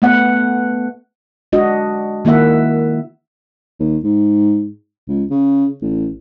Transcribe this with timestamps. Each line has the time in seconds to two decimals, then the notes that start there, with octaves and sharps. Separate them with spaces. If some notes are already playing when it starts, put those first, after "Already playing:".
0.02 A3 B3 F#5
1.52 G#3 D4 F#4 D#5
2.25 D#3 A#3 E4 E5 F#5
3.80 D#2
4.03 G#2
5.08 C#2
5.31 C#3
5.82 A1